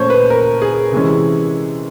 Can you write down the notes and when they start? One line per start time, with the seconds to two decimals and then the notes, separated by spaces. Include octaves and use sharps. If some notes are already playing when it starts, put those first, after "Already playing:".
Already playing: A#2 F3 A3 C#4 C5 C#5
0.10 B4
0.30 A#4
0.62 G#4
0.92 C3 E3 G#3 C#4